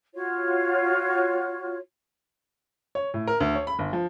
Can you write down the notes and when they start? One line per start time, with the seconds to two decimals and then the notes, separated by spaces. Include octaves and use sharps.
0.13 F4 F#4 C#5
2.95 C#5
3.14 A2
3.27 A#4
3.40 D2
3.55 C#5
3.67 B5
3.79 G1
3.93 F3